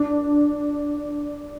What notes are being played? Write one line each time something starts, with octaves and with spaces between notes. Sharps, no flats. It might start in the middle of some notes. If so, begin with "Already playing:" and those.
Already playing: D4